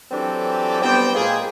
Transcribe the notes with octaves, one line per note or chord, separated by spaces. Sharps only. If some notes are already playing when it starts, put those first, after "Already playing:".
E3 F#3 C4 D4 G4 A4
G3 B3 C4 C5 G5
A#2 G#3 F4 G#4